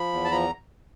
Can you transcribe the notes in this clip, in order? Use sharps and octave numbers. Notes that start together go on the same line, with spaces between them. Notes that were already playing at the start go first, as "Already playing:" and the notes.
Already playing: F3 B5
E2
A5
F3 A#5